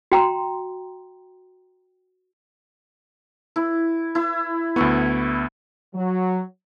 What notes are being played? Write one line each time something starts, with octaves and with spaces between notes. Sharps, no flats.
F#4 G5 A#5 C6
E4
E4
D2 B3 E5 B5 C#6
F#3